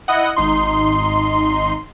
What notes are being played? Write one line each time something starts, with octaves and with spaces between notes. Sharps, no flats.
E4 D#5 F#5
G#1 D#4 C6